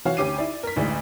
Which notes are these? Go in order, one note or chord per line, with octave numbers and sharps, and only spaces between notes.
E3 F#4 C#5 F5
D2 C#4 G4 D6 C7 D#7
E4 D5
A#4 B6
A1 D2 G#3 E4 D5